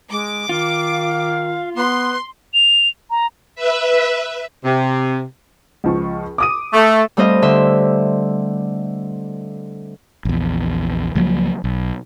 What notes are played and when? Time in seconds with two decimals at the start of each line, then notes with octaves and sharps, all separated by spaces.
0.11 G#3 D6
0.49 D#3 F4 F5
1.77 B3 B4 C6
2.54 F7
3.10 A#5
3.55 B4 E5
4.65 C3
5.84 C#2 F3 C#6
6.38 D6 D#6 D#7
6.74 A3
7.17 G3 A3 C4 C5 D#5 F5
7.42 D3 E5 C6
10.25 A#1 E2
11.15 C#2 F3 F#3 A#3
11.64 B1